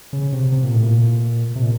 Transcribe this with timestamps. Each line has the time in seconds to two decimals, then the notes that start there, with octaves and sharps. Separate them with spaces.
0.13 C#3
0.33 C3
0.52 C3
0.64 A#2
0.74 A2
0.84 A#2
1.56 C3
1.63 A#2